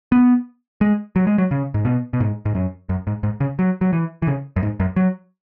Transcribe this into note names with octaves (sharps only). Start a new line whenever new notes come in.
B3
G#3
F#3
G#3
F#3
C#3
G#2
B2
B2
G#2
G#2
F#2
F#2
G#2
G#2
C#3
F#3
F#3
E3
E3
C#3
F#2
G#2
F#2
F#3